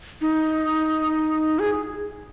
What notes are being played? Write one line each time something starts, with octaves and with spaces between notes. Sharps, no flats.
D#4
G#4